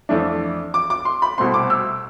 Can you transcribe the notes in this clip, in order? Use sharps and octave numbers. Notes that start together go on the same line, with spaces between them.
F2 E3 A3 D4
D6
D6
C6
B5
C2 B2 A3 C4 C6
D6
E6